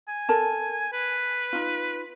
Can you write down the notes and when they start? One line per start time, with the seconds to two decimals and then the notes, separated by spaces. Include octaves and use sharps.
0.08 G#5
0.29 A4 A#4 A5
0.93 B4
1.53 D#4 F4